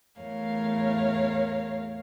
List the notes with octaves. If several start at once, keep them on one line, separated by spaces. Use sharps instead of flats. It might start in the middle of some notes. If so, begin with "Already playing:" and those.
E2 A2 A3 A#4 C#5 F5